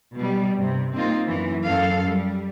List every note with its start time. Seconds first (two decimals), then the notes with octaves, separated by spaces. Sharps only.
0.15 B2 G3
0.57 G2 C3
0.93 A#3 C4 D#4 F4
1.26 F#2 E3
1.65 F#2 A4 F5
2.04 G3